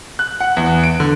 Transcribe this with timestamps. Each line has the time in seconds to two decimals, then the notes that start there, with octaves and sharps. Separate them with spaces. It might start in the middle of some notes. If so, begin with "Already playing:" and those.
0.19 F#6
0.40 F#5
0.57 E2
0.84 D7
1.00 D3